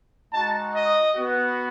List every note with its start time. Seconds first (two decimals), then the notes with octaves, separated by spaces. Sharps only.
0.32 G#3 D#4 F#4 A5
0.74 D#5
1.14 B3 F#4